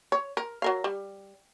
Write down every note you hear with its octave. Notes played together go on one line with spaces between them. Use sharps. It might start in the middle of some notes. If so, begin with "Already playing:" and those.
C#5
A#4
F#3 A#4 F5
G3